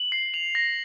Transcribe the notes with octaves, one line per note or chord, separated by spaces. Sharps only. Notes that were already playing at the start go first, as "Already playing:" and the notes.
Already playing: F#7
C7
F7
A#6